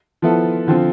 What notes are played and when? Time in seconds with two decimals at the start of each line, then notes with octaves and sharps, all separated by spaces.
0.22 F3 B3 E4 A4
0.67 D3 F3 C4 F4